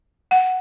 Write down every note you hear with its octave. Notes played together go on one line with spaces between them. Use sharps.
F#5